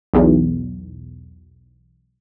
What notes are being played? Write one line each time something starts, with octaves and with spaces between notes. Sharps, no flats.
B1 E2